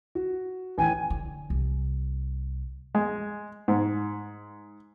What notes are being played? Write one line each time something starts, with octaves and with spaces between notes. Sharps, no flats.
F#4
A1 G5 G#5
D3
C2
G#3
G#2